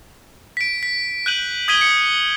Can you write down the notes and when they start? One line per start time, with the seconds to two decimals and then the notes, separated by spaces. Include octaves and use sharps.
0.57 B6 D7
0.83 B6
1.26 F#6 G6 D#7 F#7
1.68 D#6 G#6 B6 D#7 G7
1.81 C#7